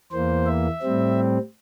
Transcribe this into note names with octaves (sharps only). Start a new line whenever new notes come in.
E2 E3 A#3 C5
E5
A2 G3 C4